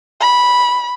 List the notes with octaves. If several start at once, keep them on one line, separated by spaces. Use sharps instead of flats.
B5